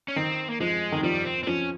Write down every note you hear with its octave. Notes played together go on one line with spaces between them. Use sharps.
C#4
D#3 C4
A#3
F3 G#3
D#3
F3 G3
C4
C4
F3 C#4